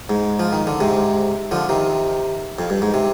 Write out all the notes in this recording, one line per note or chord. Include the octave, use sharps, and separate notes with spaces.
G#2
F3
D#3
D3
G#2 C3
D3 F3
C3 D#3
F2
G2
G#2
C3